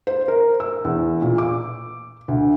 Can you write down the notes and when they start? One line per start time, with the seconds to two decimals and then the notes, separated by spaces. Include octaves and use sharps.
0.07 C5
0.28 A#4
0.60 E6
0.85 E2
1.22 A#2
1.38 D6
2.28 D2